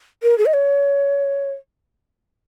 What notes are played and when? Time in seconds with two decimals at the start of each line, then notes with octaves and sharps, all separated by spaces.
0.23 A#4
0.38 G#4
0.46 D#5
0.54 C#5